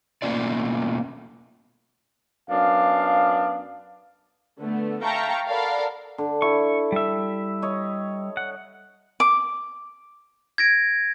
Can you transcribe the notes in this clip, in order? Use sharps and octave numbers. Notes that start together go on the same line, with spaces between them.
B2 A3 A#3 C#4 F4 D5
F#2 B3 D4 F5
D3 A3 B3
E5 F5 G5 A5 A#5 C#6
A4 A#4 D5 F5 F#5 B5
D3
E4 C#6
G3 E5
C#5 D#5
F#5
D6
G#6 A#6 D7